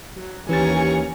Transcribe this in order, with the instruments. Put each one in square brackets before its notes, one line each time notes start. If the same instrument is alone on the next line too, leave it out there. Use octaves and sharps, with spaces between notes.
[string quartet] F#3
[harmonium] D#2 C#4 [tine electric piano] E3 G4 A6 [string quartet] G#5 A#5 C#6